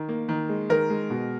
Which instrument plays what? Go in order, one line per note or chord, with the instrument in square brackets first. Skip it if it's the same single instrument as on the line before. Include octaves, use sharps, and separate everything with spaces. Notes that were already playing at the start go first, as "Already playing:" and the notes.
Already playing: [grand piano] D#3
A#3
D#3
G#3
D#3 A#4
G#3
B2